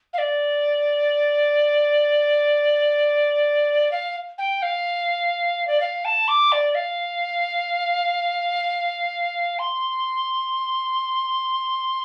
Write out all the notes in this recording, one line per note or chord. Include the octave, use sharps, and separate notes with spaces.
F5
D5
F5
G5
F5
D5
F5
A5
D6
D5
F5
C6